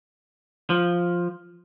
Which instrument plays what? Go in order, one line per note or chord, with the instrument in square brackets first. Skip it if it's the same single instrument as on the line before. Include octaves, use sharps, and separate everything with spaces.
[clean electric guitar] F3